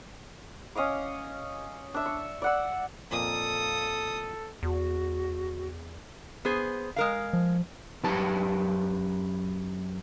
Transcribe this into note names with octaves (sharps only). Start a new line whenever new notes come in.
C#4 D#5 F5 D6
D4 E5
C#6
D5 F#5 E6
F2 A#2 A#3 A4 D#6
E2 F#4
B3 G#4 C5
G#3 A#4 F5
F3
F#2 F#3 G4 B4 A5